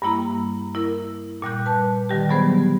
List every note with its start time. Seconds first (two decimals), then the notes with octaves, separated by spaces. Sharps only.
0.02 G2 G3 A#3 E4 A#5
0.75 E4 A#4
1.42 A#2 G3 F#6 G6
1.66 B4 A5
2.09 D3 D#3 G3 G4
2.29 F#3 G3 B3 G#4 C5